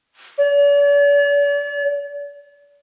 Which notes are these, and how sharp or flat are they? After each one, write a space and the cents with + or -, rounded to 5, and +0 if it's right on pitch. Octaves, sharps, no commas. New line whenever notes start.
D5 -45